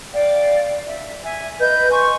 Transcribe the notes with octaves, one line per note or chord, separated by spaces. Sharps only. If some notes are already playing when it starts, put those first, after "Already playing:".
D5 F5 G5
E5
E5 G#5
B4 D#5 G6
G#5 C6 C#6